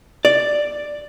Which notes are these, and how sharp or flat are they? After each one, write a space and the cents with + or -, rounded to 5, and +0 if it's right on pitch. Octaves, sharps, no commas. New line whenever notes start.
D5 +5